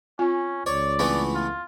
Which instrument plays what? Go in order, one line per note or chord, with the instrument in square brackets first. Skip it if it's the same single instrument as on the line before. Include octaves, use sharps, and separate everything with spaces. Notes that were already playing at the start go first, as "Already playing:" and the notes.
[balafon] C4 F4 G#5 [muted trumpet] C#4
[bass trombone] C#2 [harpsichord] C#5 [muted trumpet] D5
[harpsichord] E3 A3 B3 [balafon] C4
[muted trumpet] F4